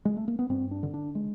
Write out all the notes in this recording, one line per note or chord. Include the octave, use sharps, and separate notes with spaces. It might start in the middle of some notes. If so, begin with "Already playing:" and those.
G#3
A3
A#3
B3
G2 C4
D4
D3
D4
G#3